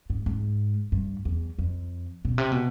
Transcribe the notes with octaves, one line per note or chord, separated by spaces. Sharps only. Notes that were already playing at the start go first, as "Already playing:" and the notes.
G#2
G#2
G2
E2
F2
B2
C3
B2